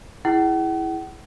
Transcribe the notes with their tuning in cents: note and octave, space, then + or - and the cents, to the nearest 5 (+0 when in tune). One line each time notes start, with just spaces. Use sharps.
E4 +0 G#4 +0 F#5 +45